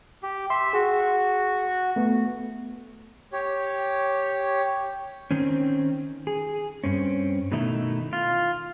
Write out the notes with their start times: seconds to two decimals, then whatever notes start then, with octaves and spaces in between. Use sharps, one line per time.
0.23 G4
0.50 E5 C6 E6
0.73 F#4 G#4
1.96 A3 B3
3.32 G4 C#5
5.31 D#3 C4 C#4
6.27 G#4
6.84 G2 C4 C#4
7.52 B2 D#3 A3 D#4 E4
8.13 F4